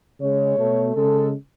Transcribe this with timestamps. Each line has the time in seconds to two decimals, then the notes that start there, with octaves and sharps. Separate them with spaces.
0.20 C#3 G#3 C#5
0.58 B2 A3
0.94 C#3 G#3 A4